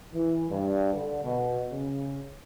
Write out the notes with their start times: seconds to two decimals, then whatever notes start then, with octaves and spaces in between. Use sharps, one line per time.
0.13 E3
0.50 G2
0.93 D3
1.24 B2
1.72 C#3